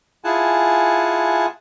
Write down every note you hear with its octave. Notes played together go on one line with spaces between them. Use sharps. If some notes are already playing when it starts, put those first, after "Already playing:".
E4 F4 G#4 F#5 G#5 A5